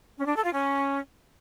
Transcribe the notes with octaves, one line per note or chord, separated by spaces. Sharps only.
C#4
D4
A4
F4
C#4